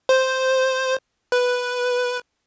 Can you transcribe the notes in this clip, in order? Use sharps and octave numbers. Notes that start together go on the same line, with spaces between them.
C5
B4